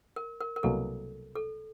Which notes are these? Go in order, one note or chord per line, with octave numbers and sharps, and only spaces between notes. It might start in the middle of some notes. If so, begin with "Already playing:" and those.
A#4
A#4
A#4
C2 B2 F#3 A#3 A4
A4